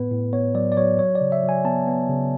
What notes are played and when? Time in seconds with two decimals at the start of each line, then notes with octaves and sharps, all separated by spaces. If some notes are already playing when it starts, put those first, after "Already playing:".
Already playing: A2 B3 B4
0.11 A2
0.33 B3 C#5
0.55 F#3 D5
0.72 D5
0.77 F#3 C#5
0.99 F#3 C#5
1.15 D5
1.21 C#3
1.32 E5
1.43 F#3
1.49 G#5
1.65 B3 A5
1.87 B3
2.09 C#3